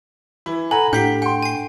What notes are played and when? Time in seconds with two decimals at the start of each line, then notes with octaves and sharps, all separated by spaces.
0.46 E3 E4
0.71 A4 F#5 G#5 A#5 B5
0.93 A2 D4 G4 F#5 G5 G6 B6 C7
1.22 F#5 G5 C6
1.43 G#5 C7